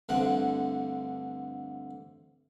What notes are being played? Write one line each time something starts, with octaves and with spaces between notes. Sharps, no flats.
D2 G2 D3 C4 F#5